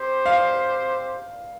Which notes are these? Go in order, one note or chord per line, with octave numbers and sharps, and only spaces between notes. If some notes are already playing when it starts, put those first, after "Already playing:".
Already playing: C4 G4 C5
F5